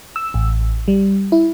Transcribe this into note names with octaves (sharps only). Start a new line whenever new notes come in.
E6
A1
G3
E4